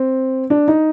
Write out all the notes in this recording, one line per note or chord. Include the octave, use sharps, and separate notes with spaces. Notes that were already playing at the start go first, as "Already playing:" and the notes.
Already playing: C4
D4
D#4